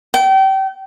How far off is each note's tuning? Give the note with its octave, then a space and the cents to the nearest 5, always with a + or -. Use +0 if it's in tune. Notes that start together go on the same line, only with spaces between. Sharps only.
G5 -30